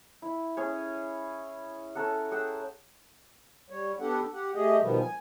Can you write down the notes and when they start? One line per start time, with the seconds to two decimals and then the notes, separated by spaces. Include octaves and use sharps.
0.22 E4
0.57 C#4 G#4 C#5
1.95 C#4 A4 A#4 F#5
2.31 G#4 F#5 G5 E6
3.70 G3 C#5
4.00 B3 D4 G4 A4 F#5
4.33 G4 F#5
4.55 A3 G4 G#4 D#5
4.81 B2 D#3 F3 G3 B3
5.00 G#5